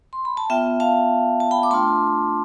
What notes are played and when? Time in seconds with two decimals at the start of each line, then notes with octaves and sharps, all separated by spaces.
0.13 C6
0.25 B5
0.37 A5
0.50 B3 F4 E5 G5
0.80 F5 A5
1.40 A5
1.51 G5 B5
1.63 D6
1.71 A3 D4 F4 A5 C6